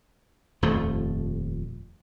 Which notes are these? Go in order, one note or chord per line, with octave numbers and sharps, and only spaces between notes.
D#1 F2 F3 A3